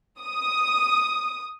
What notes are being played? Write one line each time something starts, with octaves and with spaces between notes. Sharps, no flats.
D#6